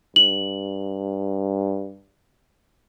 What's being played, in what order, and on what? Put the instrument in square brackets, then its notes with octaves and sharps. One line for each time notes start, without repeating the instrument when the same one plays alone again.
[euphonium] G2 [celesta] F#7